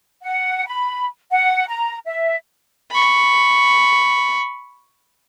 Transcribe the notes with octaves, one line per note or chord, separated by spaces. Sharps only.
F#5
B5
F#5
A#5
E5
B5 C#6